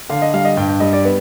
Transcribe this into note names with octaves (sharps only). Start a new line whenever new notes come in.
D3 F5
D#5
G3 F5
D#5
G2 G5
G5
G3 D#5
D5
B3